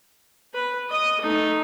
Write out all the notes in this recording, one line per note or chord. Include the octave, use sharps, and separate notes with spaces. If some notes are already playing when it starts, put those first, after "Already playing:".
B4
D#5 D#6
A3 D#4